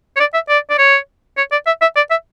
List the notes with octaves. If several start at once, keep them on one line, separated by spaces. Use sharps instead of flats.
C#5
D5
E5
D5
D5
C#5
C#5
D5
E5
E5
D5
E5